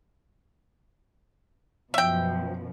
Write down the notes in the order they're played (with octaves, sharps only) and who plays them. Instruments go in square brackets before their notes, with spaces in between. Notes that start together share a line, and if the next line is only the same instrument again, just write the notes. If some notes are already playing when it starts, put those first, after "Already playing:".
[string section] F#2 B2 F3 [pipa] E5 G5